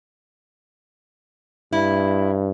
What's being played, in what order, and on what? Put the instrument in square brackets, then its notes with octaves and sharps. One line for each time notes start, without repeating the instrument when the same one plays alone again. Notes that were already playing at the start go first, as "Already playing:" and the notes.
[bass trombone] G2 [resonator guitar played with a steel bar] E4